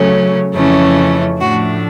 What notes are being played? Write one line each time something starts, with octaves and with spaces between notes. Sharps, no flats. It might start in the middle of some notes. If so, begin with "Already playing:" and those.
Already playing: C#3 F#3 A3 C#4
F2 C#3 E3 A3 C#4
A2 F3 A3 D4 F#4